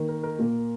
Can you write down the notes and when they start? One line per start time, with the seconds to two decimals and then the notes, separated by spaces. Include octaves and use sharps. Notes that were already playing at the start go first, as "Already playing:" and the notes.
Already playing: D#3 A#3
0.09 A#4
0.23 A#4
0.39 A#2 A#3